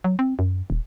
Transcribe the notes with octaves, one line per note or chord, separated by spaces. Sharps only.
F#3
C4
F#2
D#1